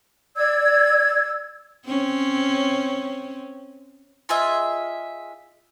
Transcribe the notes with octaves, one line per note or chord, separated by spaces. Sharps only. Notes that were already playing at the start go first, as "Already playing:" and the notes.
D5 E6 G#6
C4 C#4
F4 G#4 D#5 E5